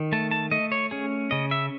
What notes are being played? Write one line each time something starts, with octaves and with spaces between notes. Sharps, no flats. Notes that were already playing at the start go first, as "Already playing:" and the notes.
Already playing: D#3
A3 A5
A5
A3 D#5
C#5
C#4 G#4
C#3 D#5
E5